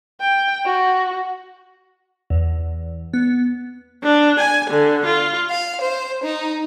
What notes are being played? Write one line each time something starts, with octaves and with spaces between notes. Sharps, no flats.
G5
F#4
E2
B3
D4
G#5
D3
F4
F5
C5
D#4